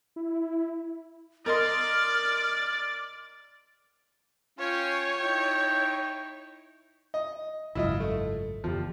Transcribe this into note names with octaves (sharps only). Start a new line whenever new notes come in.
E4
A#4 D5 D#5 C6 F6 A6
C#4 F4 C#5 G5
D#4 E4 G5
D#5
G#1 C#2 F#2 E4 F4 D#5
A3
F#1 E2 F3 G3